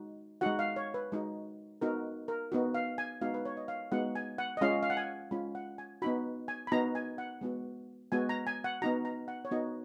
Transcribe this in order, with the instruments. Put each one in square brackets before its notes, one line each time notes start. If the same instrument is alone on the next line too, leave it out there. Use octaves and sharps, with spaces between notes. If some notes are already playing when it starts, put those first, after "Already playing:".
Already playing: [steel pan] G#3 D#4 F#4
G#3 D#4 F#4 F#5
F5
C#5
B4
G#3 D#4 F#4
B3 D#4 F#4 A#4
A#4
B3 D#4 F#4
F5
G#5
G#3 B3 D#4 F#4 F5
B4
C#5
D#5
F5
G#3 B3 D#4 F#4 F#5
G#5
F#5
D#5
G#3 C#4 F4 F5
F5
F#5
G#5
G#3 C#4 F4 B5
F#5
G#5
B3 D#4 F#4 B5
G#5
B5
B3 D#4 F#4 A#5
G#5
F#5
G#3 B3 F#4
G#3 B3 F#4 G#5
A#5
G#5
F#5
B3 D#4 F#4 A#5
A#5
F#5
C#5
B3 D#4 F#4 D#5